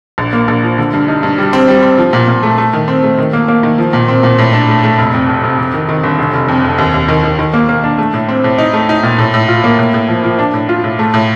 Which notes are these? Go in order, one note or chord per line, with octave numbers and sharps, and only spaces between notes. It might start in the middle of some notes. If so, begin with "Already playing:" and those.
A#1
A#3
A#1
F3
D3
G2
D#4
G2
G3
C4
G3
C4
F3
A#2
A#2
A3
A3
D#3
C4
A3
D#3
A#3
A#3
D#3
F3
A#2
C4
A#2
A2
D4
A3
A3
F1
F2
F1
F1
F2
D#3
D#3
G1
F1
F1
F2
F1
D#2
D#2
D#3
D#3
D#3
A#3
A#3
D4
A3
A2
C4
A2
D#4
A3
D#4
A#2
A2
A2
F4
A#3
A2
A2
F3
F3
D4
A2
F4
A2
A3
A2